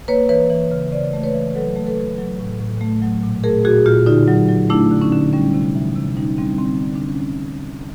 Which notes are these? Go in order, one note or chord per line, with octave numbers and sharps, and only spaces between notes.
A#3 B4 C#5
E3 B4 C#5
E3
C#3
C#3 C5 D5
A3
B4 C#5
E3
F#3 A4 B4
A3
A4 B4
F#3
F#3
A2
A2
A3
F#3
A#2
A3 G#4 A#4
A#2 F#4 G#4
A#2 F4 G4
D3 D#4 F4
F#3
F#3
A3 D4 E4
D3
C#4 D#4
D3
G3 C#4
C3
E3
C3
G3 C#4 D#4
G3 C4 D4
D3 C4
D3
D4
D3
C#4